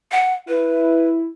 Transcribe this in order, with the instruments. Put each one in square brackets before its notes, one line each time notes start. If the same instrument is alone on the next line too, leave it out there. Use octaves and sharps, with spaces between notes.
[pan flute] F#5
[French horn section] E4 [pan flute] B4